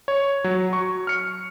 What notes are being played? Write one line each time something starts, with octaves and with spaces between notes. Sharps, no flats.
C#5
F#3
C#6
F6 C#7